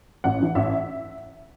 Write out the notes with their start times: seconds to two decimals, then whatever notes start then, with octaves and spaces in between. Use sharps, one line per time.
0.24 A1 F#5
0.40 G2 E3
0.55 A1 E5